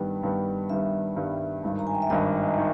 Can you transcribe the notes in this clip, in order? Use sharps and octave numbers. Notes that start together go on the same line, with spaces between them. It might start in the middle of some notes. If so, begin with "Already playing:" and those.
Already playing: G2 D#3 G3 B3 G5
G2 D#3 G3 B3
G2 D#3 G3 B3 E5
G2 D#3 G3 B3
G#1 G2 D#3
A#5
G#5
G5
E5
G#1 G2 D#3 D#5
D#3